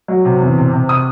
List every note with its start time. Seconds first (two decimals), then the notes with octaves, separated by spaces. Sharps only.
0.08 F#3
0.25 C3
0.42 E2
0.58 C3
0.73 C3
0.89 D#6